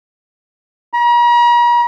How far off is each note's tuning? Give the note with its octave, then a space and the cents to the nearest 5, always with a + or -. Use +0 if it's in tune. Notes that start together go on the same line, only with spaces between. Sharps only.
A#5 +45